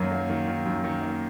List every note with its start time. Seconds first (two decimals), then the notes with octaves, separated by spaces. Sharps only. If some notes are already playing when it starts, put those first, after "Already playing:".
Already playing: F#2 D#3 F#3 A#3
0.12 A#3
0.30 D#3
0.47 D#3
0.66 F#2
0.84 D#3
1.02 A#3